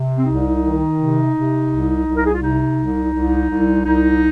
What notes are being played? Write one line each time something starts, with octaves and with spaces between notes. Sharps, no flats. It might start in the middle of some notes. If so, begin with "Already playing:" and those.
Already playing: C3
C4
C2 D#4
D#3
C3
C3
C2
C2
A#4
G#4
F4
C3 D#4
C2
C2
C2
C2 D#4